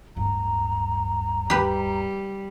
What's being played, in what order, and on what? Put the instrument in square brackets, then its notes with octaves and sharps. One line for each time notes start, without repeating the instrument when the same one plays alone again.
[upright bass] D1 G2 [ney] A#5
[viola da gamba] G3 [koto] G4 B4